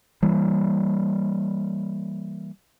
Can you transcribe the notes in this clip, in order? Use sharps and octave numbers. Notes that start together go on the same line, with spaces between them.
E3 G3 A#3